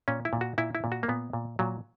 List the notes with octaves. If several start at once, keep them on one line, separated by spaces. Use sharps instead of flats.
A#2 C#4
E4
A#2
F#4
A#2 E4
E4
A#2
F#4
A#3
A#2 B3
A#2
A#2 F#3